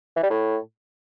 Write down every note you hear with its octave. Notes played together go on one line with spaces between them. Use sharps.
E3
G3
A2